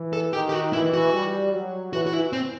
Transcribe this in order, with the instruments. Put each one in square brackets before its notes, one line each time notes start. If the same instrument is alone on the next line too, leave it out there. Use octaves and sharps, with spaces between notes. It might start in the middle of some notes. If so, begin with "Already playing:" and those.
Already playing: [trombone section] E3
[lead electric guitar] A4
[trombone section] D#3 [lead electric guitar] G4
[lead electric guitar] G4
F#4
[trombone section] E3 [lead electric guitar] E4
[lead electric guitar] F#4
[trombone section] G3
F#3
[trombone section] E3 [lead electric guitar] F#4
[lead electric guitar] F#4
E4
C4